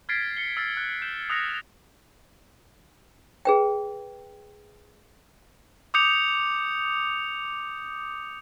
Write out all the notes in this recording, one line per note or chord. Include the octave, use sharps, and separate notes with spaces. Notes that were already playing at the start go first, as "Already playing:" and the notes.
F6 G#6 A6 B6 C7 D7
C#7 G7
E6 F6 A6 C7 D7
F#6
G6 E7
D#6 E6 F#6 A#6 C#7 F7
G#4 B4 G5
D6 D#6 G6 C#7 F7